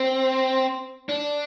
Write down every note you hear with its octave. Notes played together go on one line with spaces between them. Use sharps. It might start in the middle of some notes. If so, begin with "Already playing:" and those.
Already playing: C4
D4